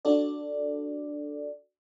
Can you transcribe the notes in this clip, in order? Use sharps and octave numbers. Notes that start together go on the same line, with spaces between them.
D4 F#4 A4 D5